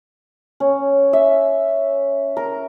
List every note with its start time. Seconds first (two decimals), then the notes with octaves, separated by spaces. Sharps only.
0.60 C#4
1.13 E5
2.37 A#4